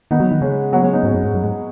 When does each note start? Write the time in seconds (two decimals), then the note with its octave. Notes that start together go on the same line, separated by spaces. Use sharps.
0.11 D#3 B3 D#4
0.20 F#3
0.31 D#3
0.41 C#3 G#3 C#4
0.73 F#3 B3
0.82 G#3 C#4
0.93 B3 D#4
1.03 G#2 C#4 F#4
1.14 F#2
1.24 G#2
1.34 F#2
1.44 G#2